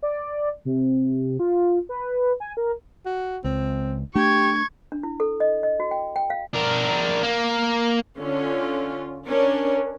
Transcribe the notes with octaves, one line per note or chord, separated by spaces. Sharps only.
D5
C3
F4
B4
G#5
A#4
F#4
C#2 C4
A3 D4 G4 C#6 G#6
D4
E4
A4
D#5
D#5
F#4
G5
G5
F5
D4 A#4
A#3
D3 C#4 F4
C#4 D4 A#4